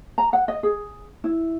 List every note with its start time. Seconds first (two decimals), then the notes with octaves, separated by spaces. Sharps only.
0.18 A#5
0.33 F#5
0.48 D#5
0.63 G#4
1.24 E4